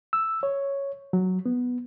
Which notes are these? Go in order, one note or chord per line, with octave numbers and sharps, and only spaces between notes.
E6
C#5
F#3
B3